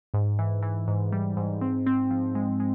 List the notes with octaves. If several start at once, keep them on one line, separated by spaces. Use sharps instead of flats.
G#2
E3
E3
G#2
G3
G#2
C4
C4
F3
G#3
G#3